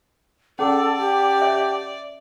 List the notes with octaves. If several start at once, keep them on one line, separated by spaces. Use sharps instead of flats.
C#4 G#4 A4 D5 F#5 A5 D6
G4
C#5 E5